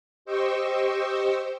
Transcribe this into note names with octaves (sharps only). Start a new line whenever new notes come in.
G4 C5 D#5 G5 C#6 E6